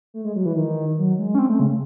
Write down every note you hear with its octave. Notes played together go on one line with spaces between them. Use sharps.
A3
G#3
F#3
E3
D#3
F#3
G#3
C#4
C4
A3
C#3